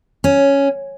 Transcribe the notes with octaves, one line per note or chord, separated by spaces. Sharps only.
C#4